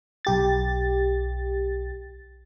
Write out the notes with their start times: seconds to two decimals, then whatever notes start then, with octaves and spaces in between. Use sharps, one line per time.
0.25 B1 G4 A6